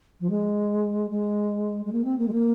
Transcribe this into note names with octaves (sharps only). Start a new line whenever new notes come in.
F3
G#3
G#3
G#3
A#3
C4
A#3
G#3
A#3